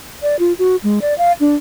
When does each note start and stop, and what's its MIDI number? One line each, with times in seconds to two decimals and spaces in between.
0.22 0.36 74
0.39 0.53 65
0.59 0.76 66
0.84 0.99 56
1.02 1.16 74
1.18 1.33 77
1.40 1.55 62